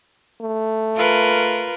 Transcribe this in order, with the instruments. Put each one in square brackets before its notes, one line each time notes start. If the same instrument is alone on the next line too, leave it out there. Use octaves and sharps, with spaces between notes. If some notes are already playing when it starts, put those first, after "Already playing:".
[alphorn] A3
[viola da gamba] F4 A#4 B4